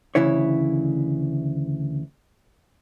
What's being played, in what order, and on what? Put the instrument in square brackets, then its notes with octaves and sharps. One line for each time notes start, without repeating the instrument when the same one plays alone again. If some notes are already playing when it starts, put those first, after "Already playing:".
[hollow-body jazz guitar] D2 C#3 E3 E4 C#5